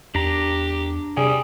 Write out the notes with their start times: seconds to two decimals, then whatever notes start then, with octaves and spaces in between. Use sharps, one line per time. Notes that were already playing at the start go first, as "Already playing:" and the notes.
0.15 E2 D4 G4 A#5
1.17 C3 G3 G#4